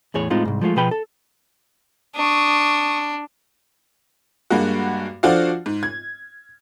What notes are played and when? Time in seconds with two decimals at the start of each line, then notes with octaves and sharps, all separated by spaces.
0.14 E2 A2 G#4 C#5
0.30 A2 G#3 C4 D#4 F4
0.45 C2 G#2
0.61 F3 G#3 A3 F4
0.76 B2 F3 G#4 B4 G5 B5
0.91 A4
2.16 D4 C#6 D#6
4.50 G2 G#3 A#3 F#4
5.23 F3 D4 F4 F#4 A4 F5
5.66 G#2
5.83 G#6